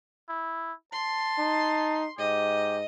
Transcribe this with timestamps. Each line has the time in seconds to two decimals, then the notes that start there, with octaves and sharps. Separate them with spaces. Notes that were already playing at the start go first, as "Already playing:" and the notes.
0.29 E4
0.93 A5 C6
1.38 D#4
2.19 G#2 G4 D#5